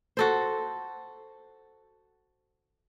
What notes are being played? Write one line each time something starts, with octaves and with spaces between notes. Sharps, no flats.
F#4 A4 C5